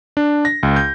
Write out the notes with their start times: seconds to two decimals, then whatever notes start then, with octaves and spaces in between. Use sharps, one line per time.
0.17 D4
0.45 A#6
0.63 C#2
0.76 G6